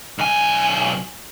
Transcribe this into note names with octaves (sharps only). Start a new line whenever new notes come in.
B1 G#5